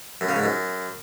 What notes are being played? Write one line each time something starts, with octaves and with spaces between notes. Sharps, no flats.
F#2
C#3
G#2
F#2